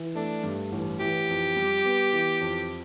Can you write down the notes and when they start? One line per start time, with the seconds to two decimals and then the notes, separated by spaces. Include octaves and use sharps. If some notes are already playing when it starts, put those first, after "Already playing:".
Already playing: E3
0.15 A3 D4
0.44 G2
0.72 A1
1.00 E3 G4
1.29 F2
1.56 G3
1.84 B3
2.13 E3
2.41 F2